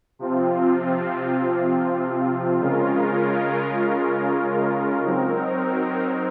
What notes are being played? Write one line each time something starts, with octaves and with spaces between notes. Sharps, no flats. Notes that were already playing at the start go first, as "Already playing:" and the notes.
C3 F3 C4 F4
C#3 G#3 C#4 F4 A#4
F#3 C4 D#4 A#4